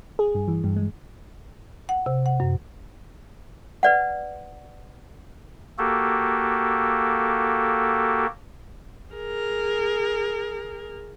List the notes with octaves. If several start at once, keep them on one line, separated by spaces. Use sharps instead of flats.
G#4
G2
E3
G2
G#3
F#5
C3
F#5
F#2
B4 D5 F#5
A#3 F#4 G4 A4
G#4 A#4